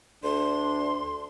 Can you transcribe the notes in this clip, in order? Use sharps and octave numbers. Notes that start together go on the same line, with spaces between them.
D2 D4 C6